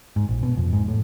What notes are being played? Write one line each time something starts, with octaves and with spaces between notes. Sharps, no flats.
G#2
A#1
B2
F2
G#2
A2